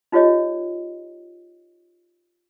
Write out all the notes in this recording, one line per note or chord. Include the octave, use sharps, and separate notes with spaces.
D#4 F4 G4 C#5 D#5